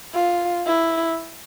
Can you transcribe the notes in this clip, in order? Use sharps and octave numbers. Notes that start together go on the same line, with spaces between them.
F4
E4